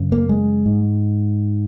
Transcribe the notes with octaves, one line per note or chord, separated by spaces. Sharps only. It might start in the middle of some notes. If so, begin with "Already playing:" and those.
Already playing: F#2 C#3
A#3
G#3
G#2